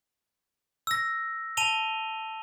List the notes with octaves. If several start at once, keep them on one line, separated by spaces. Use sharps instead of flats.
E6 A#6
A5 D#7 F7 G7